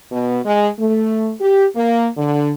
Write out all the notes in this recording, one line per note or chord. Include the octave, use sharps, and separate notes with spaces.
B2
G#3
A3
G4
A#3
D3